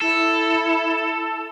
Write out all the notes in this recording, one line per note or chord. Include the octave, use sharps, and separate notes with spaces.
E4 A4